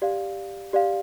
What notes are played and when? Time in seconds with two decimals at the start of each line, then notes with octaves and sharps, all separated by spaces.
0.02 G4 D5 F5
0.73 G4 D5 F5